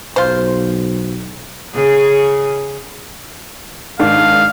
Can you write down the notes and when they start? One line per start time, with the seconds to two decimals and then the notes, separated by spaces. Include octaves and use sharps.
0.16 B1 F4 C5
1.74 C#3 G#4
4.00 G#2 D#3 D4 F5